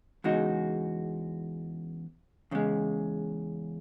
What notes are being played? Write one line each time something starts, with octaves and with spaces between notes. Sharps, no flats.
E2 C#3 G#3 D#4 F#4
E2 C#3 G#3